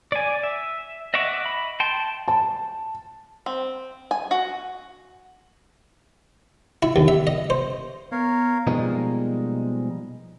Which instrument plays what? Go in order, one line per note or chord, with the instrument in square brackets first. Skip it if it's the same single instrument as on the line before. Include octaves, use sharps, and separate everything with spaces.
[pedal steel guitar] D5 G#5
E5
D#5 E5 F#5 C#6 D6
B5
G5 A5 C6
[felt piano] A5
[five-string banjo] C4
G#5
F#4
[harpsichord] E4
D#2
E5
D#5
C5
[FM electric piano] B3 [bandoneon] A#4 C#5 F5
[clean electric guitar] B2 F3 G3 G#3 A#3 D#4